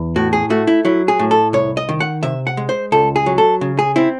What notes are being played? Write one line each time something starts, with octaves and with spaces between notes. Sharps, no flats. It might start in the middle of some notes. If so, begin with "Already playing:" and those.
Already playing: E2
A2 F#4
G#4
A3 F#4
E4
F#3 E4
G#4
A2
A4
C2 C#5
D#5
D#3
F#5
C3 E5
F#5
G#3
C5
C#2 A4
G#4
F#3
A4
C#3
G#4
C4 E4